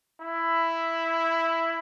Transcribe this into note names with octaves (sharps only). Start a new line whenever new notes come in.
E4